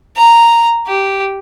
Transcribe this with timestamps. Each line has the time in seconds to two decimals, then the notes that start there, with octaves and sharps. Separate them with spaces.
0.17 A#5
0.87 G4